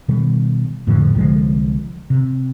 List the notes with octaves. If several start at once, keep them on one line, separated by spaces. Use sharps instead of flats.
B2 D#3 G3
F2 A2 D3 F3
C2 D3 F3 G#3
C3